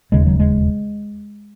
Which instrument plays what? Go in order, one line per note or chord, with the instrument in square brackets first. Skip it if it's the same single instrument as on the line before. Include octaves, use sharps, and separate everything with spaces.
[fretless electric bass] E1 D#2 C#3 G#3
F#3
G#3